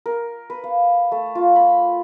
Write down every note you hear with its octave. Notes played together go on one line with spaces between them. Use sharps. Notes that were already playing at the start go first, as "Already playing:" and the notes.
A#4
B4
F5
A3
F4
B5